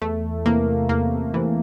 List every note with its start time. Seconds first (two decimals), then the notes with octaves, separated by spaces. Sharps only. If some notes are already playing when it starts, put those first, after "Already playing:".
0.01 E2 A3
0.45 C3 E3 A#3
0.89 E2 A#3
1.34 C3 E3